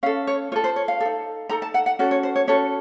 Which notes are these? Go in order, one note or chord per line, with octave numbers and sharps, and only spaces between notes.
C#4 A4 F5
C#5
F4 A4 C#5
C5
C#5
F5
D#4 A4
D#4 A4 A#5
A5
F#5
F#5
C#4 F#4 A4
C#5
C5
C#5
C#4 F#4 A4 C#5